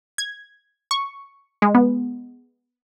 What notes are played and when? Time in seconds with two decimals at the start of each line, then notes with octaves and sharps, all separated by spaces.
0.18 G#6
0.91 C#6
1.62 G#3
1.75 B3